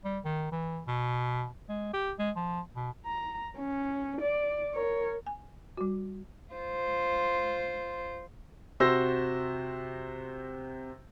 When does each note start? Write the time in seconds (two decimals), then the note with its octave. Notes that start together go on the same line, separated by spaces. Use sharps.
0.05 G3
0.25 D#3
0.52 E3
0.87 B2
1.69 G#3
1.93 G4
2.19 G#3
2.36 F3
2.76 B2
3.06 A#5
3.58 C#4
4.21 D5
4.75 A#4 C#5
5.26 G#5
5.77 G3 F#4
6.54 F4 C5
8.80 C3 F#4 C5 E6 A#6